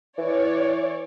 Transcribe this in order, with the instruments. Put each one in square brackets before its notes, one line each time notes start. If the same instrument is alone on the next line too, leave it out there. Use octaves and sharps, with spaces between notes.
[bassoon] E3 [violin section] C#5 D5